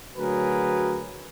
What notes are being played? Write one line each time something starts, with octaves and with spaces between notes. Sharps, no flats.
D2 F#3 F#4 G#4 A#4 B4